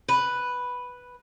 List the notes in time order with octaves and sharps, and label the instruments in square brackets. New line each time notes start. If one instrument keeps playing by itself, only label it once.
[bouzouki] B4